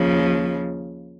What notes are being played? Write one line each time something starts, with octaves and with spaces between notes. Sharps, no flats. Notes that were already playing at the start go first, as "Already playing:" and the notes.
Already playing: D#2 C#3 F3